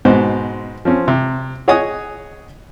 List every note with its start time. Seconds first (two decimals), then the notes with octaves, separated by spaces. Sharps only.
0.05 G#2 B2 C5
0.85 F3 C4 C#4
1.08 C3
1.68 G#4 C#5 D#5 F#5 G#5 D#6